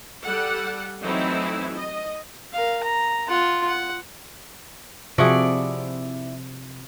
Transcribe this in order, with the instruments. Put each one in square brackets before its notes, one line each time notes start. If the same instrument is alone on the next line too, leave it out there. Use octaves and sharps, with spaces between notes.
[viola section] G3 G4 A4 F#5
E3 F#3 A3 C4 D#4 E4
D#5
[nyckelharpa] A#4 F5
A#5
F4 F#5
F#5
[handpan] C3 [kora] F3 F#4 G#4 [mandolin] E4 D5 C#6